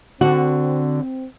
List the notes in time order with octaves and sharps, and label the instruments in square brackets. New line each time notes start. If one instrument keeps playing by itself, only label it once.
[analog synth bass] D3 [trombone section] C4 [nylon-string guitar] F#4